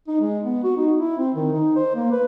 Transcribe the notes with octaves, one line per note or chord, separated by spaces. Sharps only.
D#4
G#3
B3
F#4
D#4
E4
C4
D#3
D#4
C5
A#3
B4